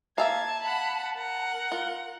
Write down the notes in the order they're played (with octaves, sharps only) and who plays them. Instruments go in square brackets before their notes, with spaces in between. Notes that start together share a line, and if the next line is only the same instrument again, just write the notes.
[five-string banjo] A#3 E5 F5 [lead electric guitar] A5 [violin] G#6
[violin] F#5 B5
A#4 F#5
[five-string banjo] F4